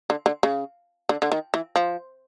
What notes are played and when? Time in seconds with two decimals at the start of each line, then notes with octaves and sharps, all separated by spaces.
0.10 D3
0.26 D3
0.43 C#3
1.09 D3
1.22 D3
1.32 D#3
1.54 E3
1.76 F3